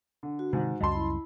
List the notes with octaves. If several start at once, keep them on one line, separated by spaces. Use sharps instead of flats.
D3
F#4
G#2 C3 D#3
C#2 F#2 G3 D#5 A5 C6
E4 B5